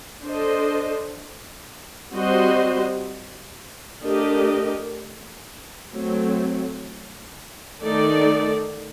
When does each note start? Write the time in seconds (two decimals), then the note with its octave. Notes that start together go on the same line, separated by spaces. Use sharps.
0.24 D4 A4 C5 D#5
2.13 G3 C4 F#4 C5 D#5
4.03 A3 D4 G4 A#4 D#5
5.93 F#3 A3 C4
7.82 D#3 A3 D#4 A4 D5